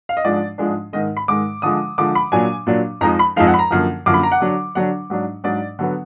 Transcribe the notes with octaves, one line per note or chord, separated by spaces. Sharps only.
F5
D#5
G#2 F3 G#3 D4 D5
G#2 F3 G#3 D4
G#2 D#3 G#3 D#5
B5
G#2 D#3 G#3 D6
D3 F3 G#3 D#6
D3 F3 G#3 D6
B5
A#2 F#3 D4 G#5
A#2 F#3 D4
F2 F3 G#3 D#4 A#5
B5
F2 F3 G#3 D#4 F5
F#5
B5
A#5
F#2 D3 F3 A#3
F#2 D3 F3 A#3 D6
B5
A#5
F#5
D3 F#3 D4
D3 F#3 D4 F#5
G#2 F#3 D4
G#2 F#3 D4 D5
D3 F#3 B3